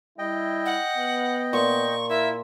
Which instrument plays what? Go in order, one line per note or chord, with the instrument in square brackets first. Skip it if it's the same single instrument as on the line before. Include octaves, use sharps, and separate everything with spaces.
[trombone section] G3 E4 [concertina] D#5 G5
[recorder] F#5
[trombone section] B3
[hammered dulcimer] A#2 [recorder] C#6
[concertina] E4 [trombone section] F4 A#4 [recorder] E5